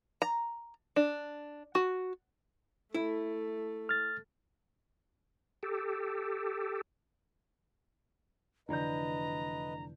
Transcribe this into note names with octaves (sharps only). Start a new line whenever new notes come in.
A#5
D4
F#4
A3 E4
F6 A6
G4 A4
F1 D3 E3 B4 D5 D#5 A#5 G6